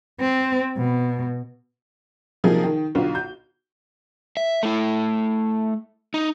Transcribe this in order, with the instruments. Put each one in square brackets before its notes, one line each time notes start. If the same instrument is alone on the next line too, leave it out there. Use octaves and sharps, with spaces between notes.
[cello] C4
B2
[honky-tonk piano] C3 F3 F#3 A#3 D#4 G#4
D#3
B1 D3 F4
G6
[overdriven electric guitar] E5
A3 E4
D#4